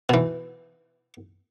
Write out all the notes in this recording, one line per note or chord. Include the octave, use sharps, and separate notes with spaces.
B2 E3